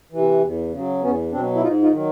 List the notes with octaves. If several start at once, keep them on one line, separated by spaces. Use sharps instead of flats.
C3 E3
E2
C#3 F#3
E2 B3 C#4
B2 F#3 C4 D4
E4
G#2 D#4 F4
D#4 F4
D#3 F#3